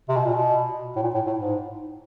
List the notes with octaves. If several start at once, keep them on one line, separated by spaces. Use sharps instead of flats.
C3
B2
A#2
B2
A2
A#2
A2
A2
G#2